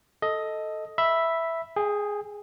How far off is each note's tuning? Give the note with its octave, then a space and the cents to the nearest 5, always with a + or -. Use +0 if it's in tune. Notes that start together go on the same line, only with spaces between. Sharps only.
A4 +0 D#5 +10
E5 +0 B5 -5
G#4 +0 G5 +35